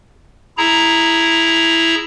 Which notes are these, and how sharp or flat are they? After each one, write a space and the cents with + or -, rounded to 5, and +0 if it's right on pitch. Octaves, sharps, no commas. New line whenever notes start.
E4 +0 G#4 +0 A#5 +0